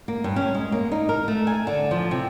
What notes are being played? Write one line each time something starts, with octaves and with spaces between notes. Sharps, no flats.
A#3
G2
C#4
G#3
A#3
D#4
A#4
A3
G#5
D3
F3
C3